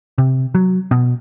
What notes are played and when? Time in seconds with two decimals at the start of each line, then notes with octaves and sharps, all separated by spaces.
0.18 C3
0.55 F#3
0.91 B2